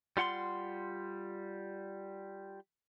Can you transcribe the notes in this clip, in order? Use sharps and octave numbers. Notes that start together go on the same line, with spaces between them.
G3 F4 F#5 G5 C6